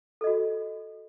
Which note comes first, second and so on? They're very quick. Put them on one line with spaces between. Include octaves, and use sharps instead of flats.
A4 D#5 F#4